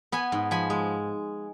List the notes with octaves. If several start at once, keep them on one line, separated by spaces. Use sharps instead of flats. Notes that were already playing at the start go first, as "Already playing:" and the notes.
B3 G#5 B5
G#2
F3 G#5 B5
G#3